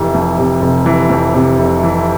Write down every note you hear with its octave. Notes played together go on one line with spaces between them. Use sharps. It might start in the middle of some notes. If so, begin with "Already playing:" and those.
Already playing: F1 C3 E3
F2
C3
F1
E3
F2
C3
F1
E3